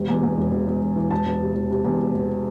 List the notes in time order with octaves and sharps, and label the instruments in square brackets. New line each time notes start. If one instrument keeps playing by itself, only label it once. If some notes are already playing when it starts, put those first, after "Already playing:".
Already playing: [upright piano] E1 C3
E2
E2
E1
E1
E1
E1
E3
E1 A5
E1
C3
E1
C3
E2
E1
E1